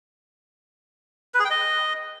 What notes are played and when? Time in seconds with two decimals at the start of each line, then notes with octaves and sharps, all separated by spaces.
1.34 B4
1.40 G#4
1.45 G5
1.50 D#5